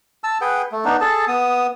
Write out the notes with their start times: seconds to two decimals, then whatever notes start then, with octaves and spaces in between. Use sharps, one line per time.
0.24 A5 E6
0.41 G#4 B4 F#5 G5
0.72 A3
0.85 B3 D4 D#4
1.01 G#4 A4 A5
1.28 B3 D#6